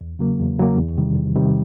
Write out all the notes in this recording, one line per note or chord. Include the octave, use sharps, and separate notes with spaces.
E2
C#3 F#3 A#3
E2
C#3 F#3 A#3
E2
C3 D#3 G3
E2
C3 D#3 G3